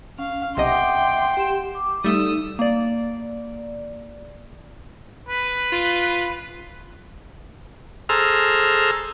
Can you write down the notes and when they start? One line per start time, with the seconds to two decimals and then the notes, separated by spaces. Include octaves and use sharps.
0.18 C#4 F5
0.57 B1 C3 D#5 E5 F#5 G5 C6 D6
1.37 G4 E7
1.75 D6
2.04 G3 A3 D#4 D#6 E6
2.59 A#3 D5
5.29 B4
5.72 F4
8.09 G#4 A4 C5 A#5 E6 F6